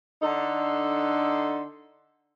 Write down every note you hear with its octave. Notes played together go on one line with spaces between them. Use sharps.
D3 D4 D#4 A4 C6